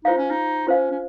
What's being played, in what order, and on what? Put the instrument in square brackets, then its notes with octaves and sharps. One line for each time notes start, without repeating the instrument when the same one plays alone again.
[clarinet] D#4 [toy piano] F4 C5 F5
[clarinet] C#4
D#4
[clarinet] C#4 [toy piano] F4 C5 F5
[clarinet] C#4